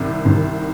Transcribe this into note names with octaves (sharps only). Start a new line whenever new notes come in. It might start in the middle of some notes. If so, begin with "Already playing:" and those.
Already playing: C2 C3 D#3
C2 C3 D#3